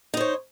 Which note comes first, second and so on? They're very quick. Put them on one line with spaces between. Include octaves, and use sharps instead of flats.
D#4 C5 C#5